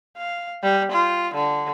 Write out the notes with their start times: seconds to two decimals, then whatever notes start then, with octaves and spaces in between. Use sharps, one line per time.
0.17 F5
0.63 G3
0.92 F4
1.34 D3